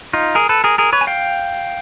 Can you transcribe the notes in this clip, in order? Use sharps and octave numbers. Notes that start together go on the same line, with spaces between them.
D#4 F4
G#4 A#4
A4 B4
G#4 A#4
G#4 A#4
B4 C#5
G#5
F5 G5